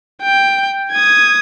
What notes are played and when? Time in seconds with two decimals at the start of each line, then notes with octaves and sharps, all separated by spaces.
0.23 G5
0.92 D#6 G#6